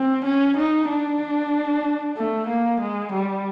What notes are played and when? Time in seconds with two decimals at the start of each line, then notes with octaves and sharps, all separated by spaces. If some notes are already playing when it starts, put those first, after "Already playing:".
Already playing: C4
0.25 C#4
0.57 D#4
0.89 D4
2.17 A3
2.48 A#3
2.81 G#3
3.13 G3